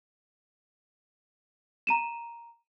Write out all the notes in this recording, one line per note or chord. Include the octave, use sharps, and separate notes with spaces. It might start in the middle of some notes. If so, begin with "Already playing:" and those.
A#5 D#7 E7